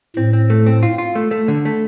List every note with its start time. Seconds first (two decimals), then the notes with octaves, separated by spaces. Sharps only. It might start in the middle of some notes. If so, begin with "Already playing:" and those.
0.16 A2 C4
0.33 C4
0.50 A3
0.66 C4
0.83 F4
0.98 F4
1.15 A3
1.31 A3
1.48 D3
1.65 A3